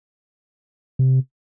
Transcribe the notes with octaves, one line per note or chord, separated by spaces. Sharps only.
C3